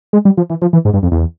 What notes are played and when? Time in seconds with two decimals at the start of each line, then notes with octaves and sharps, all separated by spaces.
0.13 G#3
0.25 G3
0.37 F3
0.50 E3
0.62 F3
0.73 E3
0.85 G#2
0.94 G2
1.03 F2
1.12 E2